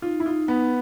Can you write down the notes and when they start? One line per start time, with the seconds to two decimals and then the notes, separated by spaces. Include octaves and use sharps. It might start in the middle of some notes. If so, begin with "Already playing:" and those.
0.02 D#4 F4
0.20 E4
0.26 D#4 F4
0.48 B3 B4